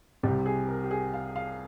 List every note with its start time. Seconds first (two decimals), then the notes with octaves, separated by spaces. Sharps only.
0.23 C2 C3 G3 G4
0.46 G#4
0.68 A#4
0.84 G4
0.91 G#4
1.14 F5
1.36 F5